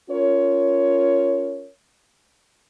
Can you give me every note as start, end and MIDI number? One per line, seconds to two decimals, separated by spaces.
0.10 1.69 61
0.10 1.69 65
0.10 1.69 70
0.10 1.69 73